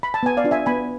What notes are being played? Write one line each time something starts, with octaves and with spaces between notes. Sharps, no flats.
B5
A5
B3 G#5
D5 F5
D4 F4
E5 G#5
B3 G#5 B5